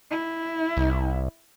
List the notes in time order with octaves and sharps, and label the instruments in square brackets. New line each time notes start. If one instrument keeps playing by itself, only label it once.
[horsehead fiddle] E4
[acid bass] C2